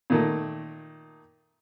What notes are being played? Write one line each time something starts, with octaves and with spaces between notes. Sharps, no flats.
A#2 D#3 A3